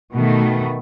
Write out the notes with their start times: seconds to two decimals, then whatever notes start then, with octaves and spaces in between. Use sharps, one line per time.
0.12 B2 D#3 A3